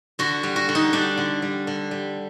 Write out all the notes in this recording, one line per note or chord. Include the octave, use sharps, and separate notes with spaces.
D3 F#4
G3
F#4
D3
D#4
G3 D4
D3
G3
D3
G3